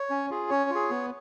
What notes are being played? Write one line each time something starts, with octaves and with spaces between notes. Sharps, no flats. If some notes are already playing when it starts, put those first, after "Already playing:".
Already playing: C#5
C#4
F4 G#4
C#4 C#5
F4
G#4
B3